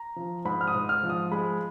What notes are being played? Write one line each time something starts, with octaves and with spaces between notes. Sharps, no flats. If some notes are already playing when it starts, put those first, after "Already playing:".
Already playing: A#5
F3
G#2 B5
F6
D#6
G#2
F6
F3
D#6
G#3 B5